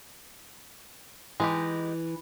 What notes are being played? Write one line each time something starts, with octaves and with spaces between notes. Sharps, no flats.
E3 G#3 D#4 G4